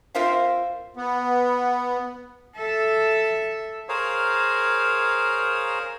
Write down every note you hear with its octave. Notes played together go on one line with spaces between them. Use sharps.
C4 F4 A#4 C5 E5 F5
B3
A4 E5
G#4 A#4 C5 C#5 F5